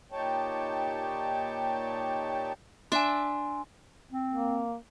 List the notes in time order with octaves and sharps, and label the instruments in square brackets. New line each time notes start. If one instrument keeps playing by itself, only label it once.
[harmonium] A#2 D#4 G4 C#5 G5 A5
[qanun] D4 E5 [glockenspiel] G#5 C6
[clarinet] C4
[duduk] A#3